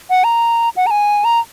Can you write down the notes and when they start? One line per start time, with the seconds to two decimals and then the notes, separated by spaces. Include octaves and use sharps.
0.10 F#5
0.24 A#5
0.77 F#5
0.87 A#5
0.91 G#5
1.24 A#5